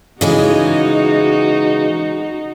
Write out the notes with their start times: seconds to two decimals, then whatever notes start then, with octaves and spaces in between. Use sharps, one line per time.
0.21 C#3 E3 G#3 D#4 F#4